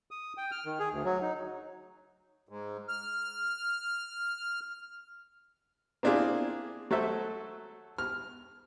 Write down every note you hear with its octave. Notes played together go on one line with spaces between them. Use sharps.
D#6
G5
F6
D#3
G#4
D2
F#3
D#4
G#2
F6
A#3 C4 D4 E4 F4 G#4
F#3 A3 A4 C5 E5
F6